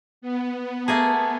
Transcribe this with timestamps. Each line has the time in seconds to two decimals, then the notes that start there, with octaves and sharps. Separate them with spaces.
0.22 B3
0.88 A3 A#3 G#4 A5